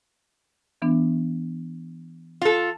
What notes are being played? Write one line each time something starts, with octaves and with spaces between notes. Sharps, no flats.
E3 B3 D4
F4 A4